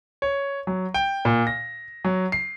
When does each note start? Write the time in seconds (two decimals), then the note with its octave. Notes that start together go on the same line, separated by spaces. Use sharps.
0.22 C#5
0.67 F#3
0.94 G5
1.25 A#2
1.47 A#6
2.05 F#3
2.32 C7